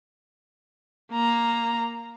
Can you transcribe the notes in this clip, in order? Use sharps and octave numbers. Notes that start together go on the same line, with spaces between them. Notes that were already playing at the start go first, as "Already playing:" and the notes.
A#3 A#5